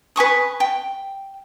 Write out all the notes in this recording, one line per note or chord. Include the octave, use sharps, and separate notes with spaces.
B4 G#5 C#6 D#6
G5